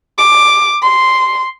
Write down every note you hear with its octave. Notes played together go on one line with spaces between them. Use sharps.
D6
C6